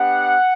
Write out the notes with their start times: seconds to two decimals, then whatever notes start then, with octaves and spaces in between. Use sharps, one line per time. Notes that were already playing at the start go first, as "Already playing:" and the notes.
Already playing: B3 D4 G4 F#5